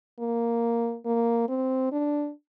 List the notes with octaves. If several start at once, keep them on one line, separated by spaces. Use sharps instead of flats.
A#3
A#3
C4
D4